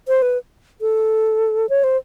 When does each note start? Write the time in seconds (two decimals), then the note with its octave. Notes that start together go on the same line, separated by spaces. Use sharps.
0.08 C5
0.22 B4
0.81 A4
1.69 C#5
1.84 C5